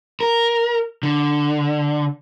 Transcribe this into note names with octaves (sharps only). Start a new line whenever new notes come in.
A#4
D3